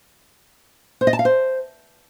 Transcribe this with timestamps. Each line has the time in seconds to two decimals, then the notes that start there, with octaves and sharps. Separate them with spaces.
1.01 C5
1.07 D#5
1.13 A5
1.19 F5
1.25 C5